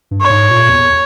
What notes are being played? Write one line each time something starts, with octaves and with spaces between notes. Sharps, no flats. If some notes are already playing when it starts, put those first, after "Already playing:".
G2
C#5
G#2
A#2
E2